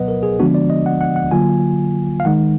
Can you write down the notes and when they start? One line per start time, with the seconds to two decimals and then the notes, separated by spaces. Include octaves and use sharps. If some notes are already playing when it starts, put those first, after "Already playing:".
Already playing: B2 F#3 B3 B4 D#5 F#5
0.08 A#4
0.23 G#4
0.39 D3 F3 G#3 B3 D4 F#4
0.55 D5
0.70 D#5
0.86 F#5
1.01 F#5
1.16 F#5
1.31 D3 F#3 A#3 F4 G#5
2.20 F5
2.25 D#3 G#3 D#4 F#5